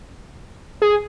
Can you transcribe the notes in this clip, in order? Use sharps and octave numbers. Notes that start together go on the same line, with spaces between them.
G#4